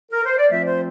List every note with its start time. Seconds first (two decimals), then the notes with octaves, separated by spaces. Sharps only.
0.12 A#4
0.25 C5
0.38 D5
0.51 F3 A3 C4 F4 E5
0.66 C5